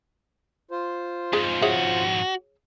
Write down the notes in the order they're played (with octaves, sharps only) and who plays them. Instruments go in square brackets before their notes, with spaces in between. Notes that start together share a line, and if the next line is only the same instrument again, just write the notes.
[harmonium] F4 C5
[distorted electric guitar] F2 G#2 [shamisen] G#4
[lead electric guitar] F#4 [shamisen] G#4 C#5 E5